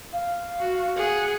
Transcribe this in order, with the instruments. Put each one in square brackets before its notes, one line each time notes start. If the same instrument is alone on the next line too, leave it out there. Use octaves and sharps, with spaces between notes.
[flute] F5
[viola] F#4
G#4 F#5